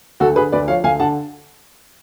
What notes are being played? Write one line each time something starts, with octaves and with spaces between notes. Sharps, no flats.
D2 F#4 A4
D3 G#4 B4
D2 B4 D5
F3 C#5 F5
D2 F5 G#5
D3 F#5 A5